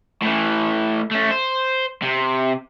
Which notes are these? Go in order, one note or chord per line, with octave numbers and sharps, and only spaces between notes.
A2 E3
A3 C#4
C5
C3